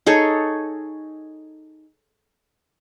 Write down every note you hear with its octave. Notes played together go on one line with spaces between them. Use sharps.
D#4 G#4 A4 C#5